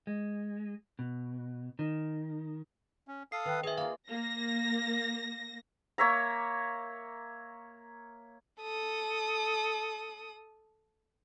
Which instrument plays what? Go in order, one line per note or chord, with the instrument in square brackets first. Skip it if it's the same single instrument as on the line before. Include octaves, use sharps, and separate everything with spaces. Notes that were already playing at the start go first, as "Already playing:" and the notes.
[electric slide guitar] G#3
B2
D#3
[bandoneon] C#4
[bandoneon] A4 F5 D#6 [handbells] C7
[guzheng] D#3 [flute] B4
[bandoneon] D#3 [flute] G#4 [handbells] B4 E5 [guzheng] D#5 G#5
[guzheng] A#3 F4 [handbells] F5
[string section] A#3 [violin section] A#6
[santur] A#3 C#5 E5 A#5
[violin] A4 D#6